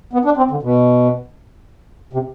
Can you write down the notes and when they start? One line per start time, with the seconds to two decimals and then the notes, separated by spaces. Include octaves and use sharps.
0.13 B3
0.25 D4
0.37 C4
0.51 D3
0.63 B2
2.13 C3